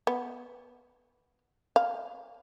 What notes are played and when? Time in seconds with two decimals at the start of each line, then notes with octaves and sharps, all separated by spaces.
0.07 B3
1.76 F5